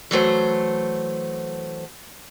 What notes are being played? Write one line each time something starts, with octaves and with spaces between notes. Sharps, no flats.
E3 F#3 A3 C5